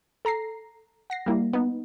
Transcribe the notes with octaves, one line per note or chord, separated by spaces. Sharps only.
A4 A#5 A#6 C7
F#5 A#6 C7
G3 A#3 E4
B3 D#4